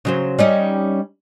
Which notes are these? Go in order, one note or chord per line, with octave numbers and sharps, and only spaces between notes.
C#3 F#3 C5
G3 C#4 D#4